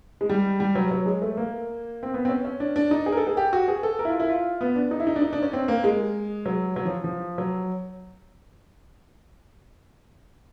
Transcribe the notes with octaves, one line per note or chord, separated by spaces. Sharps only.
G#3
G3
G3
F#3
F#3
G#3
A3
A#3
C4
B3
C4
C#4
C#4
D4
D4
D#4
G#4
A#4
A4
G#4
G4
F#4
G#4
A4
A#4
E4
F4
E4
F4
B3
D4
D#4
E4
D#4
D4
D#4
D4
C#4
C4
A#3
G#3
F#3
F#3
F3
F3
F#3